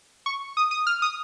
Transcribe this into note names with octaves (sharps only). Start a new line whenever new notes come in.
C#6
D#6
D#6
F6
D#6